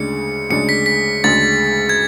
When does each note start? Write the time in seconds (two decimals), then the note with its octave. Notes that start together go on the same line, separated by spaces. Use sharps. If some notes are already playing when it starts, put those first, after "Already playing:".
Already playing: D2 C#3 G#3 D4 C#7
0.50 D2 C#3 G#3 D4 C#7
0.69 B6
0.86 B6
1.24 D2 C#3 G#3 D4 A6
1.89 G#6